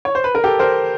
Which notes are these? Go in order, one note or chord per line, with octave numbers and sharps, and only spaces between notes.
C#5
C5
B4
A#4
G4 A4
A#4 C5